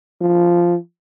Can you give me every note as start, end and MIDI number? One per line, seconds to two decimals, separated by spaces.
0.21 0.75 53